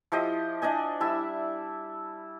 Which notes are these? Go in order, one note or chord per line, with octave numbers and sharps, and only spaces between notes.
F3 E4 G4 D#5
D4 D5 D#5 G#5
G3 E4 E5 A5